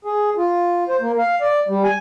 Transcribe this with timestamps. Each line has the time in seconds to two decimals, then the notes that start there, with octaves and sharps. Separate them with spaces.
0.05 G#4
0.37 F4
0.89 C5
1.01 A#3
1.18 F5
1.41 D5
1.68 G3
1.84 G#5